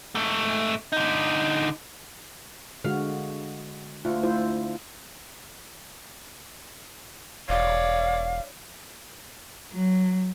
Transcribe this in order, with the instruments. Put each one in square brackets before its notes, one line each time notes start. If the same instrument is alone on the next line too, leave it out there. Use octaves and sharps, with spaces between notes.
[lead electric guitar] G#2 A3
D3 D#4
[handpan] D3 G#3 F#4 [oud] F5
[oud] D2 [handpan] F4
[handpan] E4 F4 C5
[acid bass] E1 [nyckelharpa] C#5 D5 [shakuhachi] F5
[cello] F#3